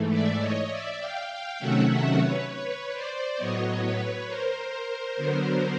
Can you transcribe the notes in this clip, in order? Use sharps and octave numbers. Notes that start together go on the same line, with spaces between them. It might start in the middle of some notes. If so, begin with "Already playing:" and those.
Already playing: G#2 E3 A3
D5 E5
C#5 D#5
D5 E5
F5 G5
F5 G5
C3 D#3 F#3 A3 C#4 E5 F#5
E5 F#5
B4 C#5
B4 C#5
C5 D5
A2 F#3 B3 C#5 D#5
B4 C#5
A#4 C5
D3 F#3 B3